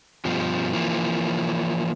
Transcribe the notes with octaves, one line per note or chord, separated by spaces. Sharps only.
G2 B2 F3
E3 F3 A#3